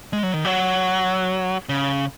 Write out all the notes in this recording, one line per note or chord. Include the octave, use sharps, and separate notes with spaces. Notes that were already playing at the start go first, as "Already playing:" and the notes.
G#3
F#3
D#3
F#3
C#3